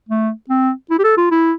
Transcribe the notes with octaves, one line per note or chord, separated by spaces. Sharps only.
A3
C4
E4
G4
A4
F4
E4